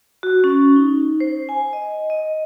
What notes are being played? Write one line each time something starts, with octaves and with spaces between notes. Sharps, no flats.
F#4
C#4
D#4
C5
G#5
D#5
D#5